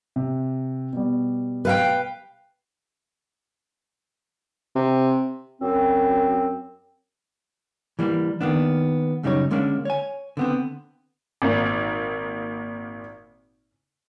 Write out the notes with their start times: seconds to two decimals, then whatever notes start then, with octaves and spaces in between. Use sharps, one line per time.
0.16 C3
0.93 B2 G3
1.65 B4 F5 G5
4.76 C3
5.60 F#2 C4
7.99 E3 G3 A#3
8.41 D#3 A#3 B3 D4
9.23 F#2 C#3 G3 D#4 G4 C#5
9.51 D3 G#3 A#3 C#4 D4
9.85 C#5 G#5
10.37 D3 B3 C4
11.42 G#1 A#2 A#3